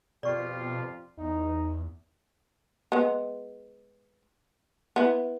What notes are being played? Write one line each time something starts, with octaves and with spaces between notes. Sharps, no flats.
F2 B2 F4 G4 D5 C#6
E2 D#4
G#3 B3
B3 E4